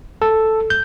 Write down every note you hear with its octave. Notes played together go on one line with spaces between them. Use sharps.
A4
G6